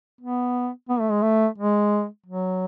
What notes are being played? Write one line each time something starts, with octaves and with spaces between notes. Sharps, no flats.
B3
B3
A3
G#3
A3
G#3
F#3